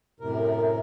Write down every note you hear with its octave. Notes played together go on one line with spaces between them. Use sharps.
F#2 A2 C3 A#4